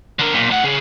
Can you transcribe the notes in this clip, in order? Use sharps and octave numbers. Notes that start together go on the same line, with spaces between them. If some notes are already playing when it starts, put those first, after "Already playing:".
D3 A#4
B1 A#2
A2 F#5
C#3 G#4